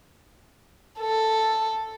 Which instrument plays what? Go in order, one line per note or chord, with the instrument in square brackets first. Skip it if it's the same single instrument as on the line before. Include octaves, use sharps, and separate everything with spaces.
[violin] A4